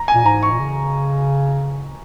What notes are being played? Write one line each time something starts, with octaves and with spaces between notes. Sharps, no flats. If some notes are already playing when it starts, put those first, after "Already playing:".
Already playing: A#5
G#5
A#2
G#2 A#5
C#6
A#2
C#3